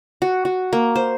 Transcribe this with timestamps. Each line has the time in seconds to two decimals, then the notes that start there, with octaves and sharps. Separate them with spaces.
0.22 F#4
0.45 F#4
0.73 A#3
0.96 C5